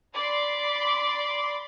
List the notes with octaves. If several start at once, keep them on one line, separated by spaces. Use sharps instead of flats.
D5 B5 C6